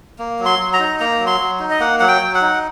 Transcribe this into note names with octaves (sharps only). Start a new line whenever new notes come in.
A#3
F#3
C6
F#3
A#5
D#4
A#3 A#5
F#3
C6
F#3
D#4
D#5
A#3 F#5
F#3 F#5
G5
F#3
F#5
D#4